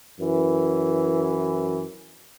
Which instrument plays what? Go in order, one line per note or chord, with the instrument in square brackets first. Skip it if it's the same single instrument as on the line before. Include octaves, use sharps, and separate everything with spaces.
[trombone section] F#2 E3